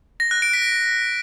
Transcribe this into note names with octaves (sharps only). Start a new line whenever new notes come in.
A#6
F#6
D7
B6